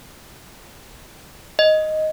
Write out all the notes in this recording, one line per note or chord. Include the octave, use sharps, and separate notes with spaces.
D#5